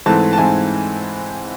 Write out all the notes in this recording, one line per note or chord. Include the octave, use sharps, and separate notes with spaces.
G#2 E3 A3 C4 A5
A5
G#2 E3 A3 C4 G#5